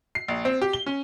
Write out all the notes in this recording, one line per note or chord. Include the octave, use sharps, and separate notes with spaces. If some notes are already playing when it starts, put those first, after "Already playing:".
C7
A#1
C4
G4
G7
C#4